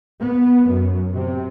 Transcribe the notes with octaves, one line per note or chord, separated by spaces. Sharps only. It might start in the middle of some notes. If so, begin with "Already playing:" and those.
B3
F#2
C3